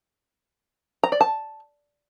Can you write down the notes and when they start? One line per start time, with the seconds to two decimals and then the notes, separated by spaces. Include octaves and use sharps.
1.03 A#5
1.12 D5
1.21 A5